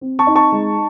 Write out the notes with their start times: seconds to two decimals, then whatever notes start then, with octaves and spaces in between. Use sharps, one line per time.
0.01 C4
0.19 A5 C#6
0.27 D#4
0.35 A5 C#6
0.52 G#3